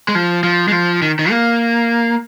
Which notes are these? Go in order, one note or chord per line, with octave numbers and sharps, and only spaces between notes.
G#3
F3
F3
G#3
F3
D#3
D#3
A#3